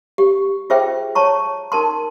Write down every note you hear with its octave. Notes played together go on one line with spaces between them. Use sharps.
G4
F4 G#4 C5 E5 G5
C#5 A5 A#5 C#6
D#4 A#4 A5 C6